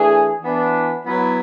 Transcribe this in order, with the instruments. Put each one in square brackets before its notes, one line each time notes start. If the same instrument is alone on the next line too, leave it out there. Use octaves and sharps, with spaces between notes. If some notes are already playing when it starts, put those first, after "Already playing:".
Already playing: [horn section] E3 A3 D4 G#4
E3 B3 D4
F#3 B3 E4